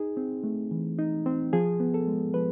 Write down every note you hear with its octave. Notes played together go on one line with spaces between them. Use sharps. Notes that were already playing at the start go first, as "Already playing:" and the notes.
Already playing: D#4 G#4
C4
A3
E3
D#4
C4
F3 G#4
B3
A4
G#3
F3 B4